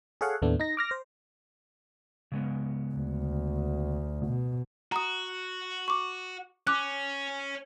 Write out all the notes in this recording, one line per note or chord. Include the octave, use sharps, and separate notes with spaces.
G#4 A4 C#5 F5 F#5
D#2 A2 A3 B3 D4
D#4 A#6
D6 F6 A#6
C5
C#3 G#3 B3
D2
B2
F#4 A#5 D#6
C#6 D6
C#4 D6 F#6